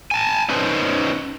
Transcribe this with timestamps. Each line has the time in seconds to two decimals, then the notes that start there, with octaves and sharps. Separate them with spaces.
0.11 G#5 A5
0.49 C#4 D#4 B4 C5